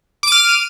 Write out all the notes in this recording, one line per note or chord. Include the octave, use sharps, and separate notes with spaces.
D6 F6 D#7